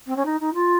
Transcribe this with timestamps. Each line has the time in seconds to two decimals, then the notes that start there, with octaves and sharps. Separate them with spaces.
0.06 C4
0.16 C#4
0.25 D#4
0.40 D#4
0.54 F4